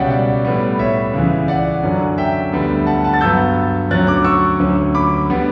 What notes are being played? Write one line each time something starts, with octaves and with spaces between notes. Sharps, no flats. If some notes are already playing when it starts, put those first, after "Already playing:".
Already playing: C#2 B2 G3 C#4 D5 E5 F#5 G5
D5 F#5
A2 G3 B3
C#5 E5
C#2 C#3 E3
D5 F#5
F#2 D3 F#3 C#4
E5 G5
D2 D3 G3 B3
F#5 A5
F#5 A5
A6
G2 F#3 B3 E6 G6
D2 D3 F#3 C#4 F#6 A6
D6 F#6
C#6 E6
D2 D3 F#3 C#4
B5 D6
D3 G3 B3